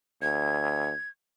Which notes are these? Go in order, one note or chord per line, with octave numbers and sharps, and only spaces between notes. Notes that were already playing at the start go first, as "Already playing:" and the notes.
D2 G#6